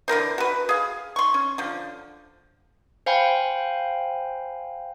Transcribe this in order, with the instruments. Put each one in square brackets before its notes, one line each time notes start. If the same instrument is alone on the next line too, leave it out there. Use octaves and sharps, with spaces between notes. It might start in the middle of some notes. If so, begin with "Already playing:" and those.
[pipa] D3 E3 A#4 C5
F#4 B4
G#4 F5
C6 C#6
C#4
D3 F3
[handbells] C5 F5 G5 G#5 B5